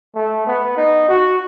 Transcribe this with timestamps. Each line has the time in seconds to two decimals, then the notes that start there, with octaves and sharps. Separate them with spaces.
0.15 A3
0.47 B3
0.77 D#4
1.08 F#4